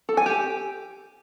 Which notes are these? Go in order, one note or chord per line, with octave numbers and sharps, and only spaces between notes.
A4
G#5
G4